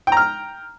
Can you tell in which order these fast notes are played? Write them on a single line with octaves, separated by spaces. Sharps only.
G5 A#5 F6